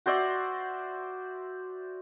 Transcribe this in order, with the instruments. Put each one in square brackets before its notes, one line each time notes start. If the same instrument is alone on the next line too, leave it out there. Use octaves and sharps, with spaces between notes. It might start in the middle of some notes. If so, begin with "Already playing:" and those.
[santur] F#4 C5 D5 E5